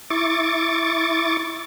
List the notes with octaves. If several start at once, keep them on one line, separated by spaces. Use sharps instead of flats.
E4 C#6 D6 A6